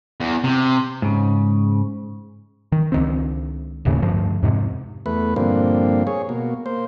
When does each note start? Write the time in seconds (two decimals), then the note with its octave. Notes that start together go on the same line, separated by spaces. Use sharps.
0.21 E2
0.44 C3
1.02 G#2 C#3
2.72 D#3
2.92 C#2 D#3 C4
3.85 D#1 D#2 A2 C#3
4.02 D2 G2 F3
4.43 F2 G#2 C3
5.06 E2 A3 B4
5.36 G2 A#2 D3 F3 A#3 C4
6.07 G#4 C#5
6.29 B2 A#3
6.66 A#3 C5